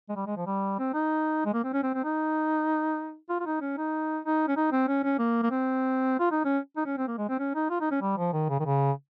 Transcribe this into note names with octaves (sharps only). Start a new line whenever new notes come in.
G#3
G3
G#3
F3
G3
C4
D#4
G#3
A#3
C4
C#4
C4
C4
D#4
F4
F4
D#4
C#4
D#4
D#4
C#4
D#4
C4
C#4
C#4
A#3
A#3
C4
F4
D#4
C#4
D#4
C#4
C4
A#3
G#3
C4
C#4
D#4
F4
D#4
C#4
G3
F3
D#3
C#3
D#3
C#3